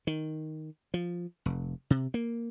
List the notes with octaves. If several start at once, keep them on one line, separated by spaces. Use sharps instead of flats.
D#3
F3
F1
C3
A#3